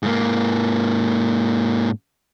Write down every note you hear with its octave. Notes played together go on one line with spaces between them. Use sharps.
G#2 A#3